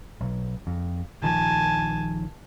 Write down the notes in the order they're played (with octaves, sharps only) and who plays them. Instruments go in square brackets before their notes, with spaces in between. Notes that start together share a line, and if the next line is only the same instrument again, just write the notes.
[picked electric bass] B1
F2
[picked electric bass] A#1 D#3 F3 [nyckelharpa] G#5 A5